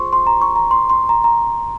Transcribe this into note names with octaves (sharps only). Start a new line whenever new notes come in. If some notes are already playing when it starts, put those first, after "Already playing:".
Already playing: F4 G#4 C5 C6 C#6
C6
A#5
C#6
A#5
C6
C6
A#5
A#5